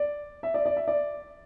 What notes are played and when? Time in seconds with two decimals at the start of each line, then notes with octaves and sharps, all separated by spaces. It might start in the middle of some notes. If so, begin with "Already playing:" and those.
Already playing: D5
0.43 E5
0.54 D5
0.65 D5
0.77 E5
0.88 D5